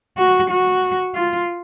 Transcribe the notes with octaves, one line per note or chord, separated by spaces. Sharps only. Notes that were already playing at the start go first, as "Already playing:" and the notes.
F#4
F#4
F4